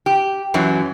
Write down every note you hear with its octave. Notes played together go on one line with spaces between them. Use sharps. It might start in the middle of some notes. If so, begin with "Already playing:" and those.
G4
F#2 E3 F#3